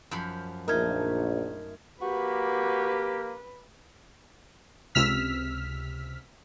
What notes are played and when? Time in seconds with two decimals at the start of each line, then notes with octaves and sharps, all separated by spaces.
0.11 F#2 F3 B5
0.68 A#1 A3 D#4 A#4 F6 G#6
2.02 A#3 F#4 G4 B4
4.95 C#2 C3 E6 F6 B6